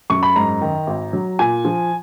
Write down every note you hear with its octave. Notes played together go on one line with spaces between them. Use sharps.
F#2 C#6
B5
G#2 A#5
D#3
G#1
F#3
A#2 G#5
F3